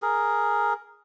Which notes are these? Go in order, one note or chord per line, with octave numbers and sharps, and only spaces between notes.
G#4 A#4